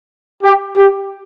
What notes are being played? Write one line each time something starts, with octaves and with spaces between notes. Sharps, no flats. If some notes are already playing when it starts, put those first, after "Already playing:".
G4
G4